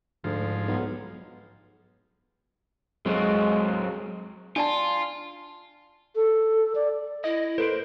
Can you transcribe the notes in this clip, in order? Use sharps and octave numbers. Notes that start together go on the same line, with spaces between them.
D2 G#2 F3
B1
F#3 G#3 C4
D4 F4 D5 A5
A4
D5
E4 D#5
A#3 A4 B4 C5 D7